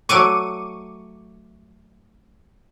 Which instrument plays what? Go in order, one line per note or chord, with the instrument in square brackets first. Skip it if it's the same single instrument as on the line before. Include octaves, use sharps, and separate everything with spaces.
[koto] F#3 A3 D5 [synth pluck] C#6 D6 D#7